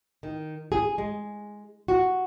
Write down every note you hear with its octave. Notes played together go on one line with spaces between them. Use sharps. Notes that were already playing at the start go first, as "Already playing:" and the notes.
D#3
G#4
G#3
F#4